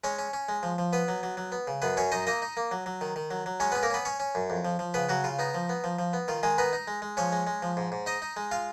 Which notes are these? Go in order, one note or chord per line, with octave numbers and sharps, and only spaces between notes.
G#3 C#4 C#5
C#4
C#4
G#3
F3
F3
B3 B4
F#3
F#3
F#3
B3
C#3
F#2 B3 B4
F#2 C#4 C#5
F#2 D#4 D#5
A#3 D#4 D#5
D#4
A#3
F#3
F#3
D#3
D#3
F#3
F#3
G#3 C#4 C#5
B3 C#4 B4
A#3 A#4
B3 C#4 B4
C#4 C#5
C#4
F#2
F2
F3
F3
C#3 B3 B4
C#3 F#3 F#4
C#3 F4
B3 D#4
F3
B3
F3
F3
B3
D#3 F4
D#3 G#3 G#4
B3 D#4 B4
D#4
G#3
G#3
F3 C#4 C#5
G#3
G#3
F3
G#2
G#2
D#4 D#5
D#4
G#3
F4 F5